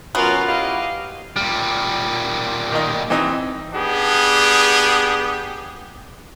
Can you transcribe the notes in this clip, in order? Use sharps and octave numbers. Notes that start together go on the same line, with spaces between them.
F#2 B3 C#4 F4 F#4 A#4
E4 G4 D#5 F5
A#2 G3 F6
D#3 D#4
E3 C4 D#4
B3 D4 G4 G#4